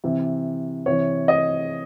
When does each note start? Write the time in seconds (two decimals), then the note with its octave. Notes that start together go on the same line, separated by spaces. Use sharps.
0.04 C3 E3
0.86 C3 E3 C#5
1.28 D#5